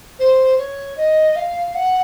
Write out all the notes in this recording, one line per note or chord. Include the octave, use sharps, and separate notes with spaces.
C5
C#5
D#5
F5
F#5